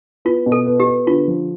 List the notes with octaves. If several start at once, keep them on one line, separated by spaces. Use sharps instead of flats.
B3 F4
B2
A4
B3
G4
B3
D3 F4
F3